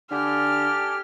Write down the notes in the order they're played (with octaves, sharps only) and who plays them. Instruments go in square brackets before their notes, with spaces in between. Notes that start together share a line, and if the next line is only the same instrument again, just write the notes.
[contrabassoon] D3 [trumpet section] G4 A4 G#5 [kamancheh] F6